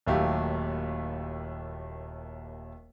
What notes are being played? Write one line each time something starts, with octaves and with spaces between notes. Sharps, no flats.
D#1 D#2 F#3 A3 G4 F5